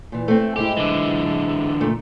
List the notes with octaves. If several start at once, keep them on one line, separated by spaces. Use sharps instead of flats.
A#2 E3
A3 C4
G#2 G#3 E4 G4
D3 E3
A#2 A3